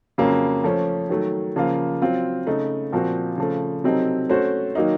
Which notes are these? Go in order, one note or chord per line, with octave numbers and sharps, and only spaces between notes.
F2 C#3 F#3 A#3 C#4
F3 A3 C#4
D#3 F#3 A3
C#3 F3 A#3 F4
F#3 C4 F4
C#3 A3 D#4
A#2 F3 C4 F#4
C#3 F3 A3
C3 F#3 C4 D#4 A4
A3 C#4 F#4 C5
D#3 F#3 A#3 D#4